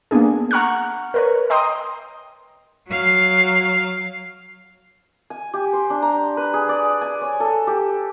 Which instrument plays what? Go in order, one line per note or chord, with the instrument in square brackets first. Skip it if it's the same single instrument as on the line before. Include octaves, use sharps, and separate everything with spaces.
[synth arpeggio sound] A#3 B3 D4 G#4
F#5 A#5 C#6 F6 F#6
A#4 B4 C#5
D#5 G5 A#5 C6 D#6
[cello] F#3 F5
[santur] G#5
G4
C5
D4
A#5
B4
G#4
D5
G#5
C#5
A4
G4